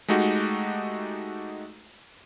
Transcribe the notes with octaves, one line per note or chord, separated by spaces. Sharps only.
G#3 A3 D#4 F#4 G4